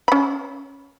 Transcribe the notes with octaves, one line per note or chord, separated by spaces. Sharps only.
C#4 B5